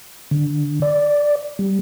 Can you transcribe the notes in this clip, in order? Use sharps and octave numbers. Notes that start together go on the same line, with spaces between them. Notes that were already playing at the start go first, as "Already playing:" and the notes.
D3
D5
G3